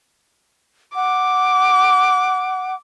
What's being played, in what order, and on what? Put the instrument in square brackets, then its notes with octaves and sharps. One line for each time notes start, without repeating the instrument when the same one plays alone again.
[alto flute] F#5 [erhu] D6